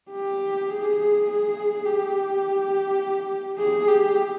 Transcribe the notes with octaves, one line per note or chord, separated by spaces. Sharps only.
G4
G#4
G#4
G4
G#4
G4